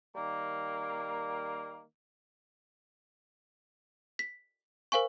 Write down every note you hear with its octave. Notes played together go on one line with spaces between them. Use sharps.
D#3 G3 A#3
B6
A#4 C5 F5 G#5 C#6